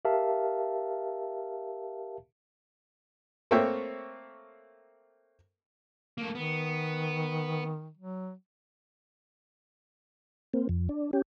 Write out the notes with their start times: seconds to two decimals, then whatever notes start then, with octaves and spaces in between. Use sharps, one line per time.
0.05 G4 A#4 E5 F5 A5
3.51 A3 A#3 C4 C#5 E5 G5
6.18 A3 A#3
6.35 D#3 B3
7.97 F#3
10.54 A#3 C4
10.69 F2
10.89 D4
11.13 C#4 G4